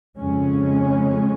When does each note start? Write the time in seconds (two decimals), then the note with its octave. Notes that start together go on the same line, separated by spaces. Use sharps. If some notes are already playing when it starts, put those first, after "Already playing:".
0.17 F2 C#3 G#3 C#4